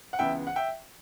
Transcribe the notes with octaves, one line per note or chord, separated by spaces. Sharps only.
F#5
C#2 C#3 E3 B3 E5 G5
F#5
E5 G5